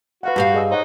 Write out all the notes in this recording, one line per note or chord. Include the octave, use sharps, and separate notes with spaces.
F#4 B4 F5 F#5
G2 G4 F5 B5
G#4 D#5 E6
D#4 C5 C#5 F#5